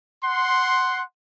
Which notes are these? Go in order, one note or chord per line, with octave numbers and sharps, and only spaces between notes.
F#5 C6